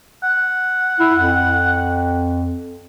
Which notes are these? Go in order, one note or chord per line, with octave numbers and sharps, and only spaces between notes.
F#5
E4
F2